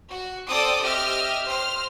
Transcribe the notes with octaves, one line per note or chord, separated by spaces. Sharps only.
F#4
C4 A4 D5 D6 D#6
G4 D#5 E5 F6
C5 F6